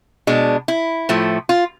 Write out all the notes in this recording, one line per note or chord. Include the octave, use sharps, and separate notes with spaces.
B2 G#3 D4
E4
A2 F3 A3
F4